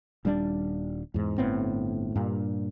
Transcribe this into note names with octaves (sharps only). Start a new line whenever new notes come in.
D#1 G3 A#3 D4
E2 G#2
G1 A2 B3 C4
G2 A#2